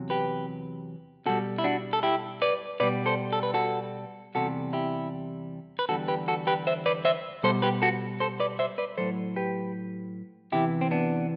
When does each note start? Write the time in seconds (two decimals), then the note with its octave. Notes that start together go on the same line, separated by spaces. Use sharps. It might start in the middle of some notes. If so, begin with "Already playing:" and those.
Already playing: E2 C3 F#3
0.10 G4 B4
1.26 B2 G3 F#4 A4
1.58 E4
1.64 D4 F#4
1.93 A4
2.03 E4 G4
2.42 B4 D5
2.80 B2 G3 B4 D5
3.06 A4 C5
3.33 A4
3.43 B4
3.54 F#4 A4
4.35 E2 C3 G3 F#4 A4
4.73 E4 G4
5.79 B4
5.89 E2 D3 G3 F#4 A4
6.08 G4 B4
6.28 F#4 A4
6.47 G4 B4
6.67 C5 E5
6.86 B4 D5
7.05 C5 E5
7.43 B2 G3 A4 C5
7.62 G4 B4
7.82 F#4 A4
8.20 A4 C5
8.40 B4 D5
8.59 C5 E5
8.78 B4 D5
8.98 A2 F#3 A4 C5
9.36 G4 B4
10.52 E2 C3 E3 E4 G4
10.81 C4
10.91 B3 D4